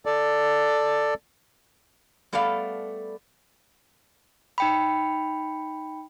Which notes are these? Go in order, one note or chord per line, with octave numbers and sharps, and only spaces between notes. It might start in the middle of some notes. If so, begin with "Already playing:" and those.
A4 D5
G3 A3 B3 A4 D5 F5
D#4 G5 B5